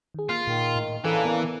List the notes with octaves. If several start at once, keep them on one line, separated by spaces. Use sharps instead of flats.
D#3 G#4
A#3 F4
A#2 D#3
A2
C#3 E3 A#3 D4 A4 G#5
B3 A#4